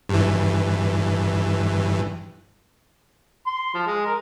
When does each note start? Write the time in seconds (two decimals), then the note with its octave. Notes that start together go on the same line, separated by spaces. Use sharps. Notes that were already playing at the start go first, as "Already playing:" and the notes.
0.09 G2 E3
3.47 C6
3.74 F3
3.86 G#3
4.06 A#4